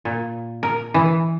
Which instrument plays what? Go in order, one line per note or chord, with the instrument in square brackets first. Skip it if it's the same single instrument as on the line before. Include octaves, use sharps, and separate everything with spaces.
[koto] A#2
A#4
E3